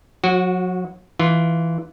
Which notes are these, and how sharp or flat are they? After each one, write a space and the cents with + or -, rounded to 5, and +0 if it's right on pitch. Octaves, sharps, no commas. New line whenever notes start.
F#3 -35 F#4 +0
E3 +0 F4 -10